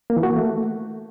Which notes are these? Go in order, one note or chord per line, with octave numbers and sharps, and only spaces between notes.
A#3
E3
F#4
A#3
A3